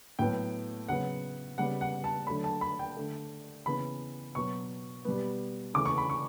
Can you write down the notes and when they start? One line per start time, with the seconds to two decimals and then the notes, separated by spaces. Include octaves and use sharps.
0.19 A2 F#3 B3 G5
0.88 C#3 F#3 B3 F#5
1.58 C#3 G3 B3 F#5
1.81 F#5
2.04 A5
2.27 D3 F#3 A3 B5
2.44 A5
2.61 B5
2.79 G5
2.97 D3 A3
3.66 C#3 E3 B3 B5
4.35 B2 F#3 B3 C#6
5.05 B2 G3 B3
5.74 C#3 E3 A3 D6
5.86 C#6
5.98 B5
6.10 C#6